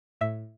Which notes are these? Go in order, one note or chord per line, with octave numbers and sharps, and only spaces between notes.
A2 E5